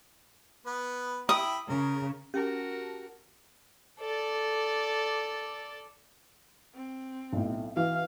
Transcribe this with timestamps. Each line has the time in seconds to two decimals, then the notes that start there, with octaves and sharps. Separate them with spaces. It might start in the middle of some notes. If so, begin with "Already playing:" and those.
0.66 B3 B4
1.29 E4 G5 B5 D#6
1.69 C#3 A#4
2.34 C#4 F#4 G4 A#4 A5
4.00 A4 D5
6.75 C4
7.33 B1 A2
7.76 E3 F#4 F5